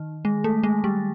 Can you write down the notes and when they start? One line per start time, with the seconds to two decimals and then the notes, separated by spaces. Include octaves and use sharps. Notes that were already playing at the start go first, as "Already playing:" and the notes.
Already playing: D#3
0.25 G#3
0.44 A3
0.63 G#3
0.84 G3